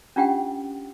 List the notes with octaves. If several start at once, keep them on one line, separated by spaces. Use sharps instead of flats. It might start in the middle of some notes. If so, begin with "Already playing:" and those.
C#4 D4 F4 G4 F#5 G5